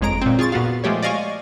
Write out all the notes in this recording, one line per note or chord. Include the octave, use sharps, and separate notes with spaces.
G1 F2 G#3 C#5 A#5 D7
A#2 C4
F4 G#4 C#6 A6
A#2 B3 F#4 F5
F3 G#3 A3 G4 C#5
D5 D#5 F5 G#5 C#6